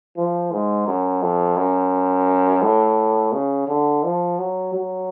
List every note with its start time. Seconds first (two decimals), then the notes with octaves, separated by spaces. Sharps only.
0.17 F3
0.52 G#2
0.87 F#2
1.22 F2
1.57 F#2
2.62 A2
3.33 C#3
3.68 D3
4.04 F3
4.39 F#3
4.73 F#3